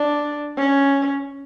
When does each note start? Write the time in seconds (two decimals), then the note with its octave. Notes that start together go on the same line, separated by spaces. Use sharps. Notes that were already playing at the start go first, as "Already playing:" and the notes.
Already playing: D4
0.56 C#4